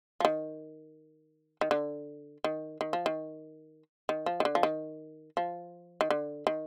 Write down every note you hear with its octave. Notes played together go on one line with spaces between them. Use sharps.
F3
D#3
D#3
D3
D#3
D#3
F3
D#3
D#3
F3
D#3
D3
F3
D#3
F3
D#3
D3
D#3